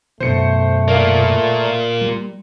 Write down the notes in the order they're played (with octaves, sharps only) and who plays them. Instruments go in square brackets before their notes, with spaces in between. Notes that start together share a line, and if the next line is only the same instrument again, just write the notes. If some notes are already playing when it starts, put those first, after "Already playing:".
[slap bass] F#2 B2 [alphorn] A3 [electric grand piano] C5 C#7
[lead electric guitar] A#3 F4 [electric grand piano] D5 F5
[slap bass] G3